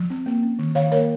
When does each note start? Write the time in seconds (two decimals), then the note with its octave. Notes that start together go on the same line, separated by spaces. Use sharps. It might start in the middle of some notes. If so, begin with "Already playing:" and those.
Already playing: F3
0.10 C4
0.26 A#3
0.43 C#4
0.59 D#3
0.75 D#3 C#5 F5
0.92 A#3 A#4 C#5